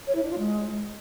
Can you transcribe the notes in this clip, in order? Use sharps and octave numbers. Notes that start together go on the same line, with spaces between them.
C#5
E4
D4
F4
G#3